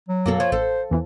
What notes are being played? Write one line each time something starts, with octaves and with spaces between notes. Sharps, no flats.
F#3
F#2 B2 A#3 F#4 A4
F3 C#5
A1 A4 C5
E2 E3 B3 E4